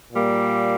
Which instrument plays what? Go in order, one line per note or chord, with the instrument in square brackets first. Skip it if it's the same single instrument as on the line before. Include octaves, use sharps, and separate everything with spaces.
[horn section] A#2 G3 A#3